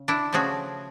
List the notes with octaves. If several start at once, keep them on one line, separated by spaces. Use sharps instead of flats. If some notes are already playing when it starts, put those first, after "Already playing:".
Already playing: C#3
D4 E4
C#3 F3 A3 F#4 G#4